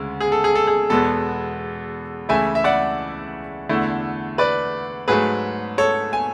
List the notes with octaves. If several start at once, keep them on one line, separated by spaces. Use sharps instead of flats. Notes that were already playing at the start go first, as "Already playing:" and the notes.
Already playing: D2 C#3 G#3
G#4
A4
G#4
A4
G#4
E2 B2 G#3 B3 A4
C#2 C#3 E3 A3 E4 E5 G#5
E5
D5 F#5
E2 D3 A3 E4
B4 D5
G#2 F#3 A3 G#4 B4
A4 C#5
G#5